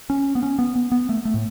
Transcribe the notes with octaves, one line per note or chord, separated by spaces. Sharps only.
C#4
B3
C#4
B3
B3
B3
A3
A3
A2